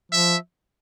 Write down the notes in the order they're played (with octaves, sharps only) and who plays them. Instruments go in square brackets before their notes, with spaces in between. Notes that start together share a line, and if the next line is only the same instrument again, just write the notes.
[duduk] F3 [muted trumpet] E5